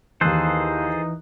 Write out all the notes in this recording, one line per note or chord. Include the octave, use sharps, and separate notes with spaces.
D#2 E3 D#4 G#4 A4 C5 F#6